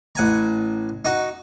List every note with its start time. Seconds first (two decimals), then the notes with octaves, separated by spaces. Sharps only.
0.15 A1 F#5 G#5 A#5
1.05 D#4 F#4